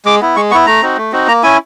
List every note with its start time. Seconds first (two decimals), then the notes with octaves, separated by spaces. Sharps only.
0.05 G#3 D6
0.21 B3 E4
0.36 G#3 C#6
0.51 B3 C#6
0.55 E4
0.66 A3 A#5
0.82 C4 D#4 F#4
0.97 A3
1.12 C4 D#4 F#4
1.28 A#3 A#5
1.43 C#4 E4 G#5